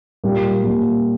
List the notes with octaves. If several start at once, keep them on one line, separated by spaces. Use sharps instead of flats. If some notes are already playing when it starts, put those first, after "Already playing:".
A#2 G3 A#3
A#2 G3 A#3